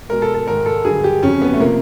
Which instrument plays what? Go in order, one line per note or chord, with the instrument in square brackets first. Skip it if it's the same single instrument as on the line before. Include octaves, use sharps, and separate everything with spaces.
[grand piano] B2 G#3 A#4
A4
A4
G#2 D#3 G#3 A#4
A4
G2 D3 F#3 G#4
G4
F2 C#3 F#3 C#4
B3
A3
C3 F3 A#3